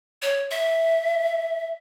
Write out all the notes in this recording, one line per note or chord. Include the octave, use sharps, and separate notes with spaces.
C#5
E5